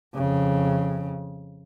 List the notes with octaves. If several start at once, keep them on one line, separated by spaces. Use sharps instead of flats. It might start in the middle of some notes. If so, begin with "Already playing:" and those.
F2 C#3